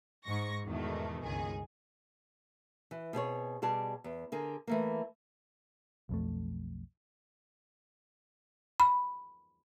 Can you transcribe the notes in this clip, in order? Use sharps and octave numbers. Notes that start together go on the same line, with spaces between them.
G#2 C#6 A#6
E2 G#2 B2 D#3 E3 A3
G1 C#2 D#3 G#4
E3
B2 C4 G#4 C#5
B2 G3 G#4 D5 A5
E2
D3 G#4 A#4
E3 A3 A#3
B1 F2 A3
B5